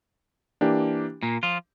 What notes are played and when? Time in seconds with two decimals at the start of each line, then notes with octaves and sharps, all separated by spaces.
0.61 E3 A#3 D4 G4
1.23 A#2 A#3
1.43 F3 F4